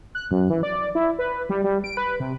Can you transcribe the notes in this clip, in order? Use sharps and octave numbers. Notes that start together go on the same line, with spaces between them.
F#6
F#2
E3
D5
E4
B4
G3
G3
D7
B4
C3